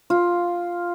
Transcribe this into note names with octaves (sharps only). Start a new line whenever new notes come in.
F4